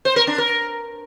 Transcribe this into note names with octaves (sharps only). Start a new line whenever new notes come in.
C5
A#4
D4
A#4